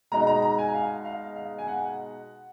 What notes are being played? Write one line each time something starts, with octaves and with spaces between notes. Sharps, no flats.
B2 G#3 D#4 A#5
A#5
A#5
G#5
F5
F5
F5
G#5
F#5